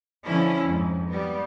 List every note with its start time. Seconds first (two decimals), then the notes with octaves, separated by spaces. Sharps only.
0.24 D3 F3 C#4 E4
0.64 F2 G#2
1.08 G3 B3